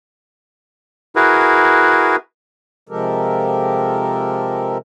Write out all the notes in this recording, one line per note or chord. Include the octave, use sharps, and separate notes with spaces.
E4 F#4 G#4 A#4 B4
C3 F3 G#3 G4 A4 A#4